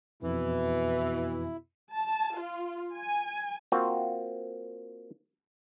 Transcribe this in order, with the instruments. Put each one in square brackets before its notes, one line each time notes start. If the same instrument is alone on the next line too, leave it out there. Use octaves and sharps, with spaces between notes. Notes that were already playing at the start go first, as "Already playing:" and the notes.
[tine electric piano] F2 [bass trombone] B2 [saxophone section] E3 [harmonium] E4
[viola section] A5
F4
G#5
[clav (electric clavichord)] A#3 C4 F4 F#4